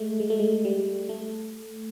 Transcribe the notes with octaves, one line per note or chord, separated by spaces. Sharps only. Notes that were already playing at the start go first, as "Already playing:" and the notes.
Already playing: G#3 A3
G#3
A3
G#3
G3
A3